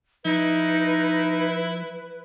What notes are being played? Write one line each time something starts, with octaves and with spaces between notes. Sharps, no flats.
F3 D#4 E4 B4